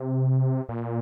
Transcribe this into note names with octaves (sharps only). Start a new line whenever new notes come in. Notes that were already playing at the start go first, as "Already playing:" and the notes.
Already playing: C3
A#2